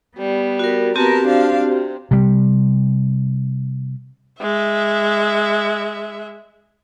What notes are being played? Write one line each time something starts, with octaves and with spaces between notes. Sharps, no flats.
G3 B3
F#4 A#4
B3 C4 F#4 G4 A#4 A5
F3 D4 F5
C3
C3 G3
G#3 E5